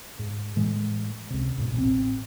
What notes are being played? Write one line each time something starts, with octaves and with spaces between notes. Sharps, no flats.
G#2
A2 E3 G#3
C#2 C3
D2 G#2 B2
A1 C4